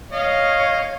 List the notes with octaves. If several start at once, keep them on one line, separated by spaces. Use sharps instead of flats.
C#5 D#5 F5